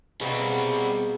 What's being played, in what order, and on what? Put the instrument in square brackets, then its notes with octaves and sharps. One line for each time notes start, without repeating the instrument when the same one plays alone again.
[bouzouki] B2 A#3 [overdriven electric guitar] G3 C4 [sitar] G#4 [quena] F#5